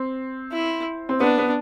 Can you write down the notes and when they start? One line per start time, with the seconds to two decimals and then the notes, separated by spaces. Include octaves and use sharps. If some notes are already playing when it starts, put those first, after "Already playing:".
Already playing: C4
0.52 E4
1.09 C4
1.20 B3 D4
1.38 B3